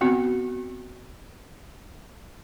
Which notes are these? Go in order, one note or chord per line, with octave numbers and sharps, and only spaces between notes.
B3 C4 F#4